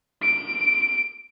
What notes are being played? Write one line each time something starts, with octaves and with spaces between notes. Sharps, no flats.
D7